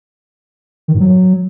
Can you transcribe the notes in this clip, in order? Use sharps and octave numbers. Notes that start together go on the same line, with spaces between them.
D#3
G#2
F#3